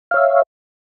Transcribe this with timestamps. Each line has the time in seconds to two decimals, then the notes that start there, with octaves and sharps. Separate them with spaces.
0.11 F5
0.14 C#5
0.17 E5